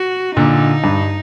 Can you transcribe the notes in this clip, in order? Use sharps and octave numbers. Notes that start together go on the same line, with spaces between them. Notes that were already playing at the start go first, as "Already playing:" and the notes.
Already playing: F#4
A#2 D3 D#4
G2